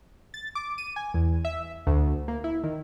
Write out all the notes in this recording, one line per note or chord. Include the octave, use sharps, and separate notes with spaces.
A6
D6
D#7
G#5
E2
E5
D2
A#3
E4
D#3